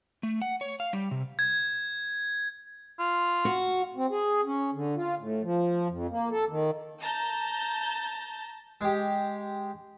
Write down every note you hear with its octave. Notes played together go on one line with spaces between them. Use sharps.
A3
F#5
C#5
F5
G3
C3
G#6
F4
F#4
C4
G#4
C#4
D3
F4
A2
F3
F2
A#3
A4
D#3
A5 A#5 G6
G#3 G4